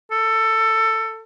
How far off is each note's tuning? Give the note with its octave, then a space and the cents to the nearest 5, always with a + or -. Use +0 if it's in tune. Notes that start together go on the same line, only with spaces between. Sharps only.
A4 +15